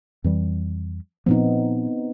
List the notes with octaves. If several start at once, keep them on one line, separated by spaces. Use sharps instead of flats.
F2 E3 G3
A#2 F3 B3 C4 D#4